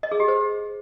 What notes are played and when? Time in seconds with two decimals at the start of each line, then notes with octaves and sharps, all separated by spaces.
0.03 D#5
0.12 G#4
0.20 G4
0.28 C5